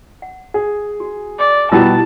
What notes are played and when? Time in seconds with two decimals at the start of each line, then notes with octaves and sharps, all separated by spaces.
0.22 F#5
0.54 G#4
1.00 F#4
1.39 D5
1.72 B2 G3 B3 E4 F4 A5 E6